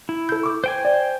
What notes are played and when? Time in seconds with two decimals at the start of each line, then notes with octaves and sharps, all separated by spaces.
0.09 E4
0.29 A4 G6
0.43 C#6 D6
0.64 C5 G5 G#5
0.85 D5